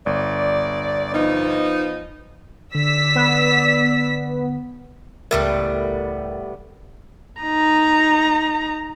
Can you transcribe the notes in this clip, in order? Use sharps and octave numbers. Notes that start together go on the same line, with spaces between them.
G1 D5
F3 B3 D#4
D3 D5 E6 B6
B3
C#2 A2 G3 B3 A#4
D#4 A#5